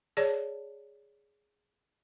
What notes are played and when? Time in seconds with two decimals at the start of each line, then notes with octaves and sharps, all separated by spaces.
0.17 G#4 C#5 D5 A5